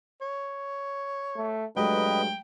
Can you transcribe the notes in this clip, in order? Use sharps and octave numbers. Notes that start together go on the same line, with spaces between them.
C#5
A3
G2 F#3 G#3 A3 B4 D#5 G5